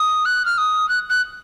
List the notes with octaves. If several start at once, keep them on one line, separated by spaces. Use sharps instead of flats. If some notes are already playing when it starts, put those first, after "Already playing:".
Already playing: D#6
F#6
F6
D#6
F#6
F#6